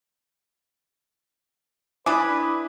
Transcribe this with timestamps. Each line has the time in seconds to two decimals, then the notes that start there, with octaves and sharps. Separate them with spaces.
2.06 D4 E4 B4 G#5 D6 D#6